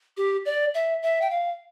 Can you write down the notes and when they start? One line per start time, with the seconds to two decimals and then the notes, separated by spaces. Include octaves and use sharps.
0.17 G4
0.45 D5
0.74 E5
1.02 E5
1.21 G5
1.30 F5